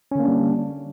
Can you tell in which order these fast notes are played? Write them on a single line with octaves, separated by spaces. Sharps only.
C#4 D3 A#3 D4 G3